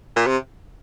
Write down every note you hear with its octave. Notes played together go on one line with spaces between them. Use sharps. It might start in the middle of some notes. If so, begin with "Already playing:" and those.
A#2
C3